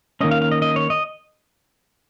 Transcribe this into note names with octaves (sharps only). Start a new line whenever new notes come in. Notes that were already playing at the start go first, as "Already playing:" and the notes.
D#3 A#3 C#4 D#5
F5
F5
D#5
D#5
C#5
D#5